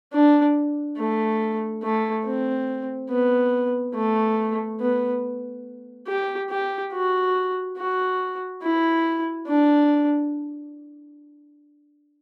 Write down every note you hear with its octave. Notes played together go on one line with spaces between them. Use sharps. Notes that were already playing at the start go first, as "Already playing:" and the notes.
D4
A3
A3
C4
B3
A3
B3
G4
G4
F#4
F#4
E4
D4